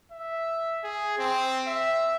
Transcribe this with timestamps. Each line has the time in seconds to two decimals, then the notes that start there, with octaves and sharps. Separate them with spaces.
0.12 E5
0.84 G#4
1.18 C4
1.67 E5